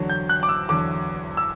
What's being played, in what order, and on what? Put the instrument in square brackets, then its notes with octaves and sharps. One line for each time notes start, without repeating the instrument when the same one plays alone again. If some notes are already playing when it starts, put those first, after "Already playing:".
Already playing: [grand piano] E2 D3 F#3
G6
F#6
D6
E6
E2 D3 F#3 D6
E6